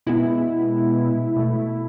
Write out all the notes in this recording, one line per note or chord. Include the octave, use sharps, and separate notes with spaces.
B2 G#3 B3 E4
B2 A3